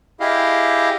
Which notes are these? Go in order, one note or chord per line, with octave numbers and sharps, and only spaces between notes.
E4 G4 G#4 D#5 F5